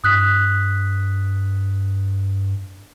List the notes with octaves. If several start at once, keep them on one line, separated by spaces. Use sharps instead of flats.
G2 D#6 F#6 B6